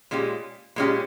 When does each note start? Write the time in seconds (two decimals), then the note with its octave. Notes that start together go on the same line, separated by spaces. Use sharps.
0.11 A#2 G#3 C#4 G4
0.76 A#2 G#3 C#4 G4